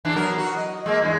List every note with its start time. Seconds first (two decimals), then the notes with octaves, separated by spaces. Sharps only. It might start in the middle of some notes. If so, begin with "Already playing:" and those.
0.05 E2 E3 D4
0.16 F#3 B3 A#4
0.38 F#4
0.56 D#5
0.86 G#3 A#3
1.02 E2 G2 G#3